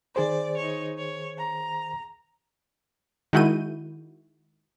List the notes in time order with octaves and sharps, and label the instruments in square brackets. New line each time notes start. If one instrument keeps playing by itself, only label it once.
[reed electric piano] D#3 G#4 C5 [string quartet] D5
[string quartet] D#4 C#5
C#5
A#5
[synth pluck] D#3 G#3 E4 F#4 G6 D#7